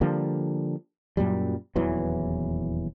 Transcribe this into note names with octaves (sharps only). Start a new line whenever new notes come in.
D3 F3 G3 A#3
F#2 A#2 F#3 G3
D#1 E2 E3 F#3